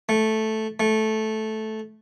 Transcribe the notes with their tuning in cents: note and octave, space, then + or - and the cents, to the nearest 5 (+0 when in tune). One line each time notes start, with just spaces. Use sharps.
A3 -5
A3 -10